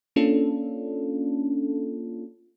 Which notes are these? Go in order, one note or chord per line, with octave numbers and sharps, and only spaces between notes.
A#3 C#4 D4 F4 A4